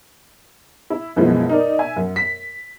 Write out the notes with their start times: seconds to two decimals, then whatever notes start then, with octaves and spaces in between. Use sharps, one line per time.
0.90 E4
1.16 F#2 B2 E3 F3 G#3 B3
1.49 D#4 A#4 D5
1.79 E5 G#5
1.96 F#2
2.16 B6